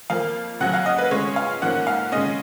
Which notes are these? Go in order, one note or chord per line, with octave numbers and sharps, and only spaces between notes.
F2 F3 A#3 F5
C#3 F#3 C#4 F#5
F5
D#5
B4
C#3 G#3 C#4 C#5
F5
G#2 F3 A#3 C#4 F#5
F5
C#3 G#3 C#4 D#5